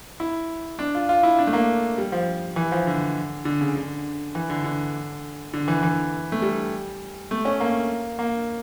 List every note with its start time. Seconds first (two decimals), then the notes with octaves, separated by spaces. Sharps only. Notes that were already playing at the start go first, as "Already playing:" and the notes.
0.20 E4
0.79 D4
0.95 F4
1.09 F4
1.23 E4
1.39 D4
1.47 A3
1.53 A#3
1.98 G3
2.12 F3
2.56 E3
2.72 F3
2.87 D3
3.45 D3
3.61 C#3
3.76 D3
4.35 E3
4.50 D3
4.64 D3
5.54 D3
5.68 E3
5.83 E3
6.32 A3
6.42 G3
7.31 A3
7.45 C#4
7.60 A#3
8.19 A#3